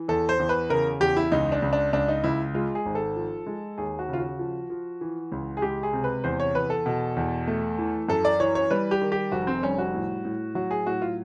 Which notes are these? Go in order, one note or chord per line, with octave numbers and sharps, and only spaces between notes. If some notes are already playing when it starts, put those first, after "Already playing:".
Already playing: E3
E2 A4
C5
E2
B4
C#3 A#4
E2 G4
E4
C#2 D#4
D4
C#2
D4
C#2 D4
D#4
C#2 E4
G#3 F4
G#4
G#1
A4
F3
G#3
D#2 G#4
F#4
C#3 F4
F#4
F3
F3
E3
C#2
G#4
G#3 G4
G#4
C3
B4
E2 C5
C#5
E2 B4
A4
B2
E2
A3
E3
F#2 A4
D5
E3 C#5
C#5
G3 B4
G4
D#3
G4
F1 F#4
C4
G3 C#4
F#4
A2
A2
F#3 F#4
G#4
A2 F#4
F4